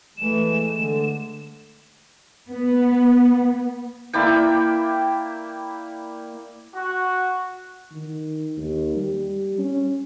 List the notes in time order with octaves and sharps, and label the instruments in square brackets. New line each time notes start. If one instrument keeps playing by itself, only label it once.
[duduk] E3 [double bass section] G#3 A3 [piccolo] E7
[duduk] D3
[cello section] B3
[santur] A#3 E4 D5 G5
[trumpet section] F#4
[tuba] D#3
D#2
G3
C#4